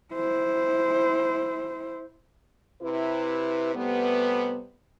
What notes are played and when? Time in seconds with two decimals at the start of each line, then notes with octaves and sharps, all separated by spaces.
0.14 E4 C5
2.82 C3 E4 B4
3.75 C3 G3 A3 B3